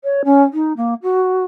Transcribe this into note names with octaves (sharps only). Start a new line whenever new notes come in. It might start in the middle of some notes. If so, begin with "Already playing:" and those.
C#5
C#4
D#4
A#3
F#4